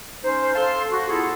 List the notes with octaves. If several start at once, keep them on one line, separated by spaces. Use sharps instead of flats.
C#4 D#4 C5
A4 F5 A5 C6
F#4
B3 E4 F4 G#4 A4